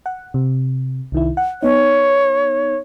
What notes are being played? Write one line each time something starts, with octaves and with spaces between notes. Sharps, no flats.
F#5
C3
C2 D#3 E4
F#5
B3 D#4 C#5